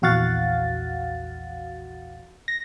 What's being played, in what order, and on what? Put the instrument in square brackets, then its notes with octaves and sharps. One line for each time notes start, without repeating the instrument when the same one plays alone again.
[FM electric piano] A#1 E2 F#4 F5 F#5 A6
A#6